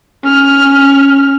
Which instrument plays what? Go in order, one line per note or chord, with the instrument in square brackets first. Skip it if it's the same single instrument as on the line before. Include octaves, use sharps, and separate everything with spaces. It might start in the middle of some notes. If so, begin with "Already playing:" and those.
[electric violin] C#4 F6